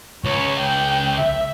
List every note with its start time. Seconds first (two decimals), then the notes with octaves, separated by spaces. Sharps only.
0.24 C#2 C#5
0.60 G5
1.18 E5